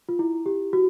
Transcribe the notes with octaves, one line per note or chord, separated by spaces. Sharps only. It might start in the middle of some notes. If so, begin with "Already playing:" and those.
F4
E4
G4
F#4